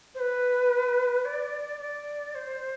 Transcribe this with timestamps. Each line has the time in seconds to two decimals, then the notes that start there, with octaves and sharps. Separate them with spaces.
0.15 C5
0.20 B4
1.25 D5
1.80 D5
2.35 C5